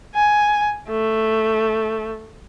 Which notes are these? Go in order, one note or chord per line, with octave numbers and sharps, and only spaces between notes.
G#5
A3